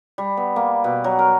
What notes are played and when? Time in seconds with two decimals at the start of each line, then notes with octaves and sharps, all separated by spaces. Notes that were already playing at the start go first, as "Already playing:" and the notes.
0.18 G3
0.37 B3
0.56 A#3
0.84 B2
1.04 F#3
1.19 A#4